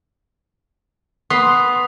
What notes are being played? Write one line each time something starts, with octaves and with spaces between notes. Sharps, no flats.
B3 C6 D#6